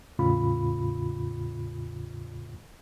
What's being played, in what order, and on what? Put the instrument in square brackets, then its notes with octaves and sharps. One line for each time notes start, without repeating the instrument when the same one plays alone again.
[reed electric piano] E2 A2 C#3 F4 B5